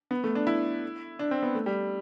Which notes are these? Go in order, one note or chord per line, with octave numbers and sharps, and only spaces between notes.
B3
A3
D4
E4
D4
C4
B3
A3
G3